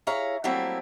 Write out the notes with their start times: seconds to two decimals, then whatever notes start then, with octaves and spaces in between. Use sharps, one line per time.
0.07 E4 G#4 C#5 F5 A#5
0.44 F#3 G3 A3 A#3 C4 E4